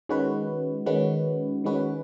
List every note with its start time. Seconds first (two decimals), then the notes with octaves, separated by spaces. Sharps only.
0.09 D#3 G#3 C#4 F#4 B4
0.86 D#3 G#3 C#4 F#4 B4
1.64 D#3 G#3 C#4 F#4 B4